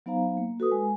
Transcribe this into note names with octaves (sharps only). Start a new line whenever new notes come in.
F#3 B3 D#4 C5 F5 A#5
A#3
F#4 A4 B4 D#6
G#3 G#5